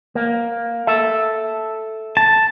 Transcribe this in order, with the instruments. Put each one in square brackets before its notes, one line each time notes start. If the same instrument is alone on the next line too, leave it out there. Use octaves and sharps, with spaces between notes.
[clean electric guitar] A#3
A4 E5
[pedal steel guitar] A5